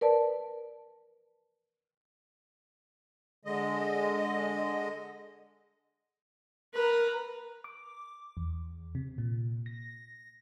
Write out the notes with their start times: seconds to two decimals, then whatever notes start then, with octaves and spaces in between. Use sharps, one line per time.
0.01 A#4 B4 D5 A5
3.45 D3 G#3 D#5
6.74 A#4 B4 A#5
7.64 D6
8.37 E2
8.95 C3
9.18 A#2
9.66 A#6